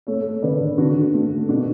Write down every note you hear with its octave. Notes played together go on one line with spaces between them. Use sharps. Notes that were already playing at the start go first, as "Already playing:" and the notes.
A3 A4 C#5
D3 B4 D5
D3 D4 F#4
A3
B2 D4 F#4